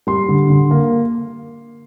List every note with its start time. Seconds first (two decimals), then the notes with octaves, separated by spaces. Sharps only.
0.07 G3 C6
0.28 D3
0.50 D3
0.71 A#3